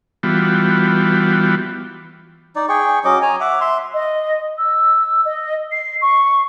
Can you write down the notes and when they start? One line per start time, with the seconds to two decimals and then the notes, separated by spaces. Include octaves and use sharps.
0.23 E3 G3 B3 F4 F#4
2.56 D#4 D5
2.69 G#4 G5 C#6
3.05 F#3 C#4 D#5 D6
3.22 C#5 G#5 A#5
3.41 E5 F#5 D6
3.61 E5 C6
3.94 D#5
4.58 E6
5.25 D#5
5.72 C7
6.02 C#6